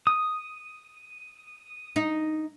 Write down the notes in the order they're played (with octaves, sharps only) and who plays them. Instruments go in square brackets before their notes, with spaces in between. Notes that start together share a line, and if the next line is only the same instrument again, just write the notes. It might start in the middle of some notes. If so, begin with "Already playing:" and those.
[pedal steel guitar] D#6
[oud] D#4